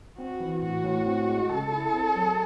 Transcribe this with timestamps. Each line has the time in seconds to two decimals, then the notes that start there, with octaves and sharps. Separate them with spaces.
0.18 C4 F#4
0.40 E3
0.62 A2 F#4
0.84 A2
1.06 C4
1.28 G#3
1.50 C#3 A4
1.72 E4
1.94 C4
2.16 F#3